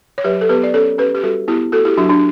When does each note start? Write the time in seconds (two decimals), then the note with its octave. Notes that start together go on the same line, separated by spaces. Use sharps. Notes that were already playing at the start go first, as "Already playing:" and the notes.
0.18 C#5
0.24 F#3 G4 B4
0.41 A4
0.49 B3 G4 B4
0.63 D5
0.74 C#4 A4 C#5
0.98 C#4 G4 B4
1.14 G4
1.23 G3 F#4 A4
1.48 B3 E4 G4
1.72 A3 F#4 A4
1.85 E4 G4
1.97 F#3 D4 F#4
2.10 D4